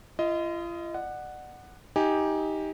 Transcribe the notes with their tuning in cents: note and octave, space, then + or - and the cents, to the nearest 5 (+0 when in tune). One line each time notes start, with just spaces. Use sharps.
F4 -40 D#5 +10
D5 +40 F#5 +0
D#4 +20 G4 +0 G#5 +0